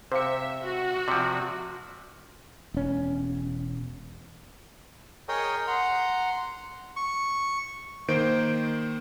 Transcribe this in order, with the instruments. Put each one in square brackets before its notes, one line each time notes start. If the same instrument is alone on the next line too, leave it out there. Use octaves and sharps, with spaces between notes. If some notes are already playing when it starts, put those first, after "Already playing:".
[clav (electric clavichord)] C3 [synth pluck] C5 F5 C#7 [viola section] E5
[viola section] F#4
[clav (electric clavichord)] C3 F3 [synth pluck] D5
[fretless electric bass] E1 C#4
[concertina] G#4 A#4 C#5 D#5 G5 D#6
F#5 A#5 C6
[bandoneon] C#6
[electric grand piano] D#3 A#3 C5 G6 D7